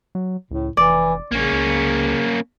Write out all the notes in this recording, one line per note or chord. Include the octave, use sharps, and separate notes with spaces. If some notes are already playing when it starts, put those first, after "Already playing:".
F#3
C#2 A2
F1 E3 D5
A#1 C#3 A#3 C#4
C#2